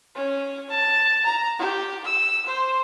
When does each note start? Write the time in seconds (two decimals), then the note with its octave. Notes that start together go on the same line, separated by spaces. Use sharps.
0.15 C#4
0.70 A5
1.25 A#5
1.59 G4
2.05 E6
2.46 C5